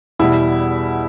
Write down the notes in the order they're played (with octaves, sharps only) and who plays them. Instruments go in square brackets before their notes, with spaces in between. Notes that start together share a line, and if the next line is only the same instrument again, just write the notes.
[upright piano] E2 B2 G3 E4